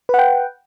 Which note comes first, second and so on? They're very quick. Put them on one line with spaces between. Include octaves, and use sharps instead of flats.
B4 F#5 G5